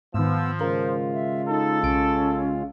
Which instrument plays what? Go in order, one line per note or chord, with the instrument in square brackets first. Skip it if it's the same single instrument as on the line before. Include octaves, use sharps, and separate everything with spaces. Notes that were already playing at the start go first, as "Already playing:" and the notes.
[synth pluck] G#2 D#3 [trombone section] F3 [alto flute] B3 [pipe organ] E6
[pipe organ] C#3 G#3 F4 [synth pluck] A#4 [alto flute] C5
[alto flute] E5
[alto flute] D#4 [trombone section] A4
[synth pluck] B1 D7 [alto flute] C#4